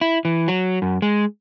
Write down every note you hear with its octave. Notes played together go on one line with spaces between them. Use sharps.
E4
E3
F#3
F#2
G#3